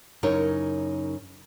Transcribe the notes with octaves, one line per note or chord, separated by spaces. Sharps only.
F#2 C#3 D#4 E4 A#4 C#5